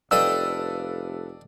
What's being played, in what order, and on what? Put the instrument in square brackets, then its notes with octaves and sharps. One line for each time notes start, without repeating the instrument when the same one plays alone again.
[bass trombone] F1 [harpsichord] D4 D#5 G5 [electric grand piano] A4 B4 F5 [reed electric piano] E6